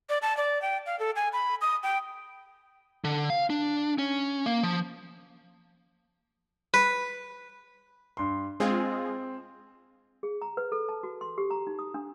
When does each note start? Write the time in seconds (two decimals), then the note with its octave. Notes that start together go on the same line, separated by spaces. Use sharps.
0.09 D5
0.22 A5
0.37 D5
0.62 G5
0.86 F5
0.99 A4
1.16 G#5
1.33 B5
1.61 D#6
1.83 G5
3.04 D3
3.30 F5
3.50 D4
3.98 C#4
4.46 A#3
4.63 F3
6.74 B4
8.17 G2 C6
8.60 G#3 C4 F4 G#4
10.23 G#4
10.42 A#5
10.57 B4
10.72 A4
10.89 A5
11.03 F#4
11.21 C6
11.38 G4
11.51 A#5
11.67 D#4
11.79 D#6
11.94 D4